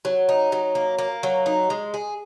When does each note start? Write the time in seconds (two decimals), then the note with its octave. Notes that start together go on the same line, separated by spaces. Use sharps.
0.05 F#3
0.29 D#4
0.52 F#3
0.75 A#3
0.98 A#3
1.23 F#3
1.46 D#4
1.70 G#3
1.94 G#4